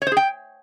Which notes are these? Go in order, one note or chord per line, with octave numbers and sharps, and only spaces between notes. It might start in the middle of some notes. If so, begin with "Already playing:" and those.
C#5
C5
G#4
G5